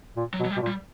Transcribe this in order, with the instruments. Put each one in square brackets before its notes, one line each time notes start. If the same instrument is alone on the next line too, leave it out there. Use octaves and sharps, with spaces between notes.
[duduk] A#2
[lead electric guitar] F#3
[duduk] B2
[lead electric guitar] F#3
G3
[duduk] B2
A#2
[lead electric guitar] G3